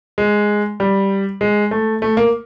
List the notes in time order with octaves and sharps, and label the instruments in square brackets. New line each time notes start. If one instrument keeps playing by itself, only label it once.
[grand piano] G#3
G3
G#3
A3
A3
A#3